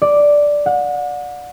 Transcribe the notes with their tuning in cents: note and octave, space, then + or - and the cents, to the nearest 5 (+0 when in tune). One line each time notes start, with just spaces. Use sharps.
D5 +0
F#5 -35